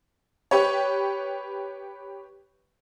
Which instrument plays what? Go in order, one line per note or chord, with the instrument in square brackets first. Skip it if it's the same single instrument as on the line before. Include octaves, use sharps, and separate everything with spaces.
[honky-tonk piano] G4 B4 C#5